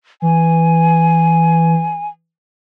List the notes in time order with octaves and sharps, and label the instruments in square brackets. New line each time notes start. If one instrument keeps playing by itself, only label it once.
[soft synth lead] E3 [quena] G#5